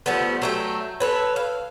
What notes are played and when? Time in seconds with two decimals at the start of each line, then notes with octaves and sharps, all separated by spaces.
0.06 F3 G3 A3 B3
0.42 F#3 A3 G5
1.00 A4 B4 C#5
1.36 F5